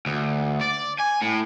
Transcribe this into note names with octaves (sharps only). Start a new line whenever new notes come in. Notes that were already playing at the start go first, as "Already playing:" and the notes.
D2
D5
G#5
A2